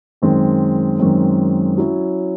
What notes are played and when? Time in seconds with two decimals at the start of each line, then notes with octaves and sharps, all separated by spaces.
0.22 F#2 D#3 G#3 C4
0.99 F#2 D#3 G#3 C4
1.77 F#3 C#4 E4